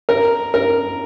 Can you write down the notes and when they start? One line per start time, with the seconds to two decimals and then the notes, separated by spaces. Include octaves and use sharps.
0.09 A#4
0.54 A#4